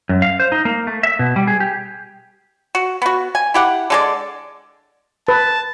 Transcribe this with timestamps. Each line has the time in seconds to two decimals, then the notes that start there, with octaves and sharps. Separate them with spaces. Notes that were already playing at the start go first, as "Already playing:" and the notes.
0.09 F#2
0.22 F5
0.40 C5
0.52 D#4
0.65 A#3
0.87 A3
1.03 E5
1.19 B2
1.36 G3
1.47 G#4
1.60 G4
2.75 F#4
3.02 B3 F#4
3.35 G#5
3.54 E4 G4 F#5
3.90 D3 G#3 D5
5.28 B4 A5